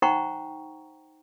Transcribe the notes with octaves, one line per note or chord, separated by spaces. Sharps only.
D#4 C5 F#5 G5 A#5 C#6